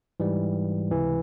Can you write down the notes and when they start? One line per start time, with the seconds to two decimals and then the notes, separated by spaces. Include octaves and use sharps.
0.20 G#2 E3 G3
0.91 C#2 C3 E3